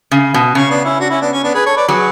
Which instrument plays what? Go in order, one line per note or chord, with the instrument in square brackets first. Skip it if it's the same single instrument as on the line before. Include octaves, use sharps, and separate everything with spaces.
[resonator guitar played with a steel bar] C#3
B2
[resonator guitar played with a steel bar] C#3 [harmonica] C#4
[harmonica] B3 D4
C#4 E4
D4 F#4
C#4 E4
B3 D4
C#4
B3 D4
G#4 B4
A4 C#5
B4 D5
[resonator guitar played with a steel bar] F#3 [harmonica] G#4 B4